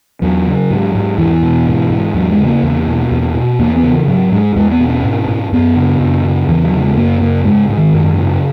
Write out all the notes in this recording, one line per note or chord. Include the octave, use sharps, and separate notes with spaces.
E2 F#3
C#3
G#2
G#2
E2 E3
B2
G#2
G#2
E2 F#3
G#3
C#3
A#3
E2
B2
E2
B2
E2 A#3
B3
C#3
E3
G#2 F#3
G#2 G#3
E2 G#3
B3
B2
C#4
G#2
G#2
F#2 B3
C#3
F#2
C#3
E2 E3
F#3
C#3
G#3
F#2 A#3
C#3 A#3
G#2 G#3
G#2
D#3
F#2
C#3